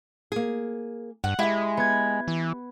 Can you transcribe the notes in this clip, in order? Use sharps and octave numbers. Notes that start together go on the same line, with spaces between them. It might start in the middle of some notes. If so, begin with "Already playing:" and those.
A#3 G#4
G2 F#5
G#3 E4 G4 E5
B3 G#6
E3